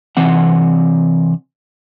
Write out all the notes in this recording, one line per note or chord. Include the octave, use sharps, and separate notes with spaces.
C3 E3 C4 F#5